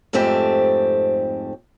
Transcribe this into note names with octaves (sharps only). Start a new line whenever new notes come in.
F2 G#2 A3 C4 G4